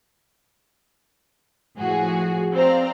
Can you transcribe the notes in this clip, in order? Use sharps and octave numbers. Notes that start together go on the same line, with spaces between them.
A2 F3 F#4 G#4
C4 C5 D5 F5 A#5